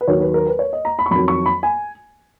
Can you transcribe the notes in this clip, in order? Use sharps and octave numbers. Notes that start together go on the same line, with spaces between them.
B4
D#2 D#3 F#3 C#5
B4
A#4
B4
C#5
D#5
A#5
B5
C#6
F2 D#3 F#3 B5
C#6
B5
G#5